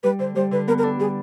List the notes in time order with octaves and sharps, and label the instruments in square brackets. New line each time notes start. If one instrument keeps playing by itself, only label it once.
[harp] G3 [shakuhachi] B4
[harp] D3 [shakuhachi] C5
[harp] G3 [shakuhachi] C5
[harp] D3 [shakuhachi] B4
[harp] B3 [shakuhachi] A#4
[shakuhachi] A#4
[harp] D4 [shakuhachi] A4
[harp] G3 [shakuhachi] G#4